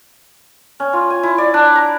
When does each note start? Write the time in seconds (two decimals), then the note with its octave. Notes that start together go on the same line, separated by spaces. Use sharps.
0.80 C#4
0.93 F4
1.10 G#5
1.23 E4
1.38 D5
1.54 D4
1.75 A#5